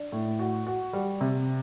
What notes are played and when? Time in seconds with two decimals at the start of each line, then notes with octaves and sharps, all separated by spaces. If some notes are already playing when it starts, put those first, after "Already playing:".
Already playing: D4
0.12 A2
0.39 F#4
0.67 F#4
0.93 G3
1.21 C3